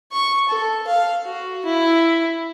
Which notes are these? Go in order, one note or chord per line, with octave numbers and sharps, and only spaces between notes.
C#6
A4
F5
F#4
E4